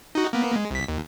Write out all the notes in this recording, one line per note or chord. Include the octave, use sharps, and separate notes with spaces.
D#4 F#4
A#3 B3
G#3
C2 B6
D#2